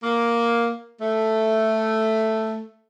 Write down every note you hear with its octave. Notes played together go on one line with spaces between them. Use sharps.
A#3
A3